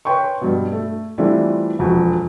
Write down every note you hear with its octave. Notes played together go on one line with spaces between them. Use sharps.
B4 C#5 G5 C6 C#6
G2 B2
A3
E3 G3 A3 C4 D4 F4
E1 F2 F#4